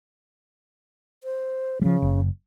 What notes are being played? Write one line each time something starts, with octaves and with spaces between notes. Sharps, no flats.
C5
C#3 F3 G3
F#1